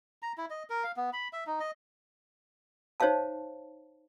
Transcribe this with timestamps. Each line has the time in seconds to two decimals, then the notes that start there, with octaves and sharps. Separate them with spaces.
0.22 A#5
0.38 E4
0.50 D#5
0.70 A#4
0.84 F5
0.97 B3
1.13 B5
1.33 E5
1.47 D#4
1.60 D#5
3.00 D#4 C5 C#5 E5 F5 A5